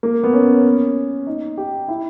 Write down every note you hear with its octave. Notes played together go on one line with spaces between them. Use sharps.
A#3
B3
C#4
D#4
G4
E4